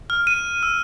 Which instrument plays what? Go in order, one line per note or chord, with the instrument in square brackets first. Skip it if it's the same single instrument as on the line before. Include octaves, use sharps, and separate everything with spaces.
[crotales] F6
D#7
E6